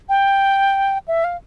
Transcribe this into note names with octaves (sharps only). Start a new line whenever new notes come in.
G5
E5
F5